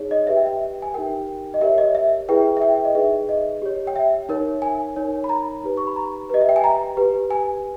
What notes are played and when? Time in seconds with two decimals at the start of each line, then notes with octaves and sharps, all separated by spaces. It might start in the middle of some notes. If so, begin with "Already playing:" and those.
Already playing: D#4 G#4 C#5
0.11 D#5
0.27 G4 B4 E5
0.37 G5
0.46 E5
0.82 G#5
0.94 D#4 G4 A#4 G5
1.54 D#5
1.61 G4 A#4 C#5 E5
1.78 D#5
1.95 E5
2.29 E4 G#4 B4 G5
2.57 E5
2.62 G5
2.85 D#5
2.95 D#4 G#4 B4 E5
3.29 D#5
3.62 G4 C#5
3.87 G5
3.96 E5
4.29 D#4 A#4 C#5
4.62 G#5
4.96 D#4 A#4 C#5
5.24 B5
5.29 A#5
5.63 D#4 G4 B4
5.77 C#6
5.87 B5
5.96 A#5
6.30 G4 B4 D#5
6.41 E5
6.49 G5
6.56 G#5
6.64 A#5
6.97 G4 B4
7.31 G#5